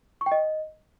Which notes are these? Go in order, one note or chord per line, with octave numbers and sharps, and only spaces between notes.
C#6
G5
D#5